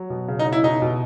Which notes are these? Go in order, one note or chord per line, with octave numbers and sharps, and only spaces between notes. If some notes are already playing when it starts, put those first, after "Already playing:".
Already playing: F#3
B2
C#3
D#4
C#3
E4
B2 D#4
B2